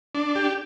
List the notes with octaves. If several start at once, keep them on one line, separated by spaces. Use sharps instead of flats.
D4
G4